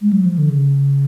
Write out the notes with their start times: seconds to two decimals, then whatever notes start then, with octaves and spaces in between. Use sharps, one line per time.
0.01 G#3
0.13 F#3
0.25 F3
0.38 D3
0.50 C#3